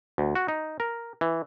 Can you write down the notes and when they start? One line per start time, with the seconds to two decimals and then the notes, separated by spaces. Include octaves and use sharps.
0.18 D2
0.35 F#4
0.48 D#4
0.80 A#4
1.21 E3